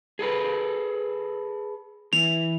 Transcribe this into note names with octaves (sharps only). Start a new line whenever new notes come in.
G#4 A4 B4
E3 F7